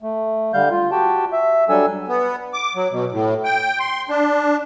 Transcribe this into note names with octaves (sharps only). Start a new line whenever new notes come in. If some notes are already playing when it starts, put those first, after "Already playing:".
A3
D3 G3 F5 G6
F4
F#4 G4 G5 A5
E5
F#3 G3 D4 A4 G#5 E6
B3
D6
F#3
B2
A2
G5
C6
D4